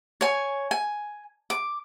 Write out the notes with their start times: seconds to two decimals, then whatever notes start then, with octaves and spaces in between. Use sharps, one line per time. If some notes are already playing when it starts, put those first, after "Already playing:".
0.21 C#5 G#5
0.71 G#5
1.50 D6